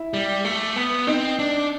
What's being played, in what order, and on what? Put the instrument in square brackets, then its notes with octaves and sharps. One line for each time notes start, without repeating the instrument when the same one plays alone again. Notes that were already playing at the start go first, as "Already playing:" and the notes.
Already playing: [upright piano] E4
[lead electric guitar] G3
A3
B3
[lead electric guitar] C4 [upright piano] D#4
[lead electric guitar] D4